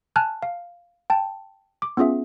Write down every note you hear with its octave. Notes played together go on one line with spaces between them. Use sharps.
G#5 A5 F6 F#6
F5
G5 A5
D6
B3 C#4 F4 G#4 E5